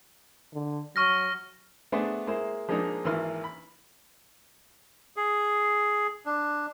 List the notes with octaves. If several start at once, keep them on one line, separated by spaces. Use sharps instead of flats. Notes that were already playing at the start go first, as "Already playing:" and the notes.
D3
F#3 C#6 F6 A#6
A3 B3 D4 G#4 B4 C5
G#3 A#3 E4 C5
F3 G#3 A#3 D4 D#4
G#1 E3 A#3 B4 C6 F6
B5
G#4
D4